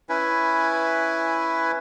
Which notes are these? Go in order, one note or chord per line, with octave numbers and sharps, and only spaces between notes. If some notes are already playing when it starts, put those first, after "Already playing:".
C#4 E4 B4 G#5